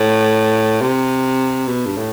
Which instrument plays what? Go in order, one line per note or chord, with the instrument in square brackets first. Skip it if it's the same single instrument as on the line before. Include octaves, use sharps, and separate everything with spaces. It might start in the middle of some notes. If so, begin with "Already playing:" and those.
Already playing: [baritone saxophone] A2
C3
B2
G2
A2